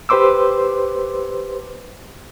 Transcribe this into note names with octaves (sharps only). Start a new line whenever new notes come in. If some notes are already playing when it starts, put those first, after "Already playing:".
G4 B4 C5 C6 D6 E6